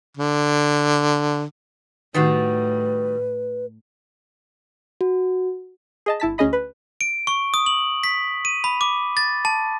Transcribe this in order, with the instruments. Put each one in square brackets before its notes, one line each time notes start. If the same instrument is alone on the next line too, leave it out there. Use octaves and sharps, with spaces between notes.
[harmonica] D3
[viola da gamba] A2 [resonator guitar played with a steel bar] D#3 G3 F#4 [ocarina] B4
[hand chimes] F#4
[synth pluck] G#4 D#5 A5
G1 E4 A5 B6
D2 C#4 G#4 D#5 B5
B4
[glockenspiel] D7
C#6
D#6
F#7
B6
D#7
B5
D6
A6
A5